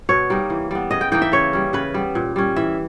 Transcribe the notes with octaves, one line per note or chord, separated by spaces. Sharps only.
B2 C#5
G3 A#3 D#4
E3
G3 B3
C#3 D#5
G5
E3 A#3 D#4 G5
E5
C#3 C#5
G3 C#4
C#3 B4
G3 B3
A#2
G3 C#4
E3 E5